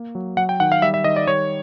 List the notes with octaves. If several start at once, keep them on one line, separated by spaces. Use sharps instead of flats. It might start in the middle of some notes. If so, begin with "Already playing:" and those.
Already playing: A#3
F#3
F#3 F#5
G5
D#3 F#5
F5
G3 E5
E5
D#3 D#5
D5
G3 C#5